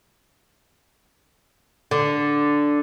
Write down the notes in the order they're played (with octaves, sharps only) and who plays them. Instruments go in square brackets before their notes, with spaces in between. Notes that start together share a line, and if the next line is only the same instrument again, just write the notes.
[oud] D3